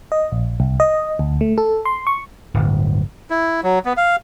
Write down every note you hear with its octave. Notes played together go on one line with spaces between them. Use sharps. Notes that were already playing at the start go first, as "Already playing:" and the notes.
D#5
A#1
C2
D#5
D2
A3
A4
C6
C#6
D1 G1
E4
F#3
B3
F5